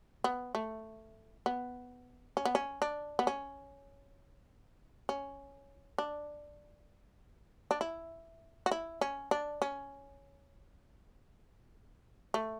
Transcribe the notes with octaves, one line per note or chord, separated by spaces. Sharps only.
B3
A3
B3
C#4
B3
C#4
D4
B3
C#4
C#4
D4
D4
E4
F#4
E4
C#4
D4
C#4
A3